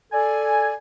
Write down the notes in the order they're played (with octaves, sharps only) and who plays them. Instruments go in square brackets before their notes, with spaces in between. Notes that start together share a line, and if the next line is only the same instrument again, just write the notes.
[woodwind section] A4 D5 G#5